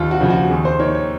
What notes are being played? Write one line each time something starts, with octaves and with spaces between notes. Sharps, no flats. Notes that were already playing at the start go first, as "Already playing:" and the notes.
Already playing: D#2 F4
F#4
C#3 F3
F#4
D#2 G#4
C5
D#3 C#5
C#5